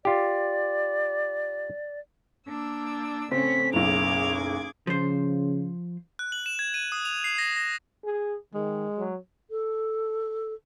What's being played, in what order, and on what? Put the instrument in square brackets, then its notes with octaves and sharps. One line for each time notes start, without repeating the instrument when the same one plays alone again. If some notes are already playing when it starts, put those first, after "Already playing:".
[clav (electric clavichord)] F4 G4 [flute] D5
[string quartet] A#3 D4 E6
[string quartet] A2 C#3 C#4 [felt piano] C4 [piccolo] B6
[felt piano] F#1 B1 [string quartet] G#4 D6 G#6 [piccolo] F7
[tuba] C#3 [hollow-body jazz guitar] F3 C5
[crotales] F#6
F#7
E7
G#6
D#7
D#6
F7
C7
A#6
A#6
[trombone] G#4
[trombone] D#3 [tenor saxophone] G#3
[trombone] F#3
[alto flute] A4